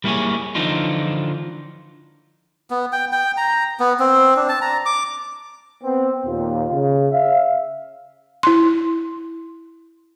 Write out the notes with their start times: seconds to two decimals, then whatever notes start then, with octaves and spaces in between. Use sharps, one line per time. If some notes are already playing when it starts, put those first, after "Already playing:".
0.04 G3 A#3 E4 F#4 G#4 C#5
0.55 D3 E3 F3 D4 D#4 F4
2.70 B3
2.92 G5
3.12 G5
3.37 A#5
3.80 B3
3.99 C4
4.36 D4
4.49 A5
4.62 A#5
4.86 D6
5.84 B3 C4
6.26 D#2 A#2 F4
6.72 C#3
7.12 E5 F5
8.43 E4 C6